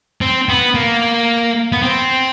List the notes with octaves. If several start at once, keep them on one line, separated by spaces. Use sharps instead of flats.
C4
B3
A#3
B3
C4